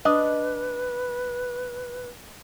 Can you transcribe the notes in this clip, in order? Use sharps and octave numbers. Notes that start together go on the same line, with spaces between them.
D4 B4 D#5